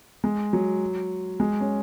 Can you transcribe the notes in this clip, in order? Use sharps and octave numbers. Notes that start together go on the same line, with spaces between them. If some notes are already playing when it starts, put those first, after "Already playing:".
G#3
F#3
G#3
C#4